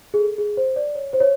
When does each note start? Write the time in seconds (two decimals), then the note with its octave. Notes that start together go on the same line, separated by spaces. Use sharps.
0.14 G#4
0.19 A4
0.38 G#4
0.57 C5
0.76 D5
0.95 C#5
1.13 C5
1.20 C#5